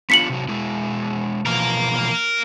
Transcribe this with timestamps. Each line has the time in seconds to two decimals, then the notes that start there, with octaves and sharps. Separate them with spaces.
0.10 B3 D4 F4 B6 C#7 F#7
0.29 C3 F#3
0.49 B2 G#3 E4
1.46 B2 E3 F3 A#4 F5